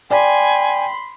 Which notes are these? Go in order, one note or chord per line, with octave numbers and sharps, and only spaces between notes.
D5 G5 G#5 B5 C6